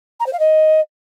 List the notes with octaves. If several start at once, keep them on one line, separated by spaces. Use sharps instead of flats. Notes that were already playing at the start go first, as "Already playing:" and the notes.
A#5
C5
F5
D#5